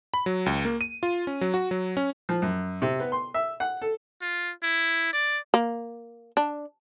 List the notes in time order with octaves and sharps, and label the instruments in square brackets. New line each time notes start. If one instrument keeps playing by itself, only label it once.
[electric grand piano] B5
F#3
C#2
A#3
D#7
F4
C#4
F#3
F#4
F#3
C#4
[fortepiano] F3
F#2
C3
B3
C6
E5
F#5
A4
[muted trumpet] F4
E4
D5
[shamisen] A#3
D4